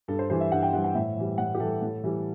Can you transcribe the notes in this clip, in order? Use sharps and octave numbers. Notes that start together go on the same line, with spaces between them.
G2 A4
C5
E3 G3 C5
E5
G2 F#5
G5
E3 G3 F#5
F#5
A2 E5
E3 G3
A2 F#5
G4
E3 G3 A4
A2
E3 G3